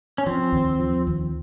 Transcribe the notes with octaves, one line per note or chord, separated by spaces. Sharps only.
C#4
F3 C4
D#2
F3
D#2